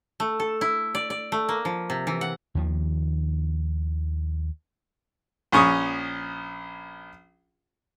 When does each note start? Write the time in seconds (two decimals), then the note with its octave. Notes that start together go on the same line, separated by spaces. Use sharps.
0.20 A3
0.40 A4
0.61 E4
0.95 D5
1.10 D5
1.32 A3
1.49 A#3
1.65 F3
1.90 C3
2.07 E3
2.21 F#5
2.55 D#2 D#3 F3
5.52 A#1 C#4 C#6 D#6